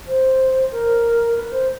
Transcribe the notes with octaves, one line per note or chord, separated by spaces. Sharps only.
C5
A#4
B4
C5